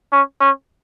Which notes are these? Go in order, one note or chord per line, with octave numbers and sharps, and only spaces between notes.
C#4
C#4